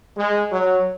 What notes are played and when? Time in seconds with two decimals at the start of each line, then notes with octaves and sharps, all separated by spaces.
0.16 G#3
0.51 F#3